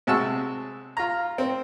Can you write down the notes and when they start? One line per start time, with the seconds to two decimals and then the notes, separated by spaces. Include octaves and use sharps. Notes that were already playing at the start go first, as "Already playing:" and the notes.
0.07 C3 G#3 F#4 A5 E6
0.97 F4 A#5
1.38 C4